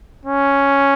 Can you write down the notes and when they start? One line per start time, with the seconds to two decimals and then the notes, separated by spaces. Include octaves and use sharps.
0.25 C#4